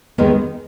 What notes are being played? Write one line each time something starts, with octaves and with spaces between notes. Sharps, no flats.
D#2 D#3 G#3 B3 D#4